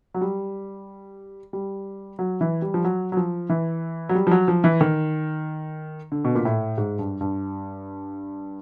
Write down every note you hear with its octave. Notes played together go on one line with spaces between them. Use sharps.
F#3
G3
G3
F#3
E3
G3
F3
F#3
F#3
F3
E3
F#3
G3
F3
F#3
F3
E3
D#3
D3
B2
A#2
A2
G#2
G2
G2